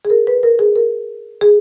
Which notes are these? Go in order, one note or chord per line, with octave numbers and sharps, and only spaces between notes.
G#4
A#4
B4
A#4
G#4
A#4
G#4